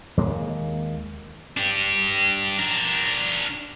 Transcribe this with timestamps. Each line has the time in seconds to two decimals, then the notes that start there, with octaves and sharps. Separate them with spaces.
0.17 D#2 G#3 A#3
1.57 D4 G4
2.58 D4 A#4